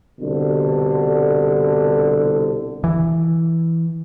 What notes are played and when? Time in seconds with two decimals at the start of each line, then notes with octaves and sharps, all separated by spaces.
0.20 C2 G2 B2 D3
2.84 E3